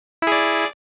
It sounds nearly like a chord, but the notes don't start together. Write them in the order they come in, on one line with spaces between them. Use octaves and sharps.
E4 G#4 D5